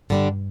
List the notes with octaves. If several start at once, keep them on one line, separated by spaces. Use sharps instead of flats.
G2 D3 G3 D4